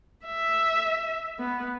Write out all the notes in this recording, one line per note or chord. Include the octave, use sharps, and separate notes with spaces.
E5
B3